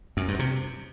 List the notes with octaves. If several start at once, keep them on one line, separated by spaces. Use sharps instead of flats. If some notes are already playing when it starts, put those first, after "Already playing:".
F#2
G2
C3